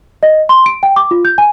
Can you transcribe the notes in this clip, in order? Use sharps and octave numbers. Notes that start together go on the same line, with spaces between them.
D#5
C6
D7
G5
D6
F4
G6
G#5